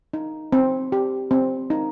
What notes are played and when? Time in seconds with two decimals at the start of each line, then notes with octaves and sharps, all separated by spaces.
0.13 D#4
0.53 C4
0.92 G4
1.31 C4
1.70 D#4